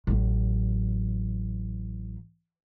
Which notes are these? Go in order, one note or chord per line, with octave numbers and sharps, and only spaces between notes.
A1 F#3